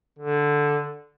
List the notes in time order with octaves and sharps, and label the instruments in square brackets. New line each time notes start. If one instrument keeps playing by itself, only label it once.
[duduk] D3